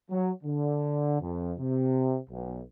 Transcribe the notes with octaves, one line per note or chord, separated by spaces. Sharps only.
F#3
D3
F2
C3
B1